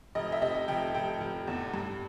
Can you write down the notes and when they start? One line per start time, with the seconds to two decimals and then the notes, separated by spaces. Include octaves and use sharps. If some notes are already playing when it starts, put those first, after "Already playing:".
0.15 F1 D#5
0.32 E5
0.42 C3 D#5
0.68 F1 G5
0.94 F1 G5
1.20 F1
1.47 E2
1.74 G2